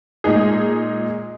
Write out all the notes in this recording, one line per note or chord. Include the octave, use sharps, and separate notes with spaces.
A#2 G#3 D#4 G#4